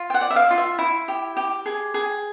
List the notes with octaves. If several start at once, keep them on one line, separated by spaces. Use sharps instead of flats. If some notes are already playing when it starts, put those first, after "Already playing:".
Already playing: F4
G5
F#5
D5
E5
F5
F4
E5
E4
G4
G4
G#4
G#4